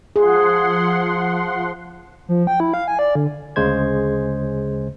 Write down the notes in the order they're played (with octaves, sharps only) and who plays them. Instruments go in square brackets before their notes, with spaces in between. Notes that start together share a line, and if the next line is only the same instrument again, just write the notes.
[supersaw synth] F3 F#5 C6 [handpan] G#4
[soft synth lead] F3
G5
E4
F5
G#5
D5
D3
[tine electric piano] D2 C#3 G#3 C5 G#6